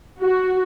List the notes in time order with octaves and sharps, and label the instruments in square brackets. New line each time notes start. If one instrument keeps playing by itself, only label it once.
[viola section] F#4